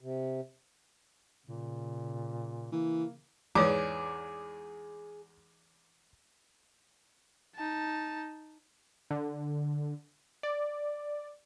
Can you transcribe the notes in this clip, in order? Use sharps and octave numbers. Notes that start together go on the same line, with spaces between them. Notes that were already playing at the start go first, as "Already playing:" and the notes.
C3
A#2 C#3
E3 A#3
E2 G#2 G#4 B4 C#5 D5 D6
D#4 A5
D3
D5